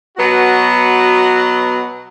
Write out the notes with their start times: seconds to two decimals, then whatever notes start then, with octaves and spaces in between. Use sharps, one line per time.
0.17 B2 F#3 B3 F#4